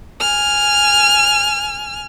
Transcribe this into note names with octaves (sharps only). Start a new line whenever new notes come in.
G#5 F6